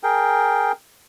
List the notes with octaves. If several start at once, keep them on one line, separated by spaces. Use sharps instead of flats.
G#4 A#4 G5